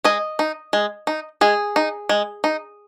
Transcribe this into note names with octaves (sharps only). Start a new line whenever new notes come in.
G#3 D#5
D#4
G#3
D#4
G#3 G#4
D#4
G#3
D#4